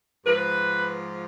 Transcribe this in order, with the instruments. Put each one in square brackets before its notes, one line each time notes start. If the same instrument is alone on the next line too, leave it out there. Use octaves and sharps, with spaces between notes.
[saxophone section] G#2 F3 B4